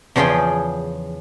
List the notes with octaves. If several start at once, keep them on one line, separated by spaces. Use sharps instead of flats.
E2 C#3 F3 F4 G#4 G5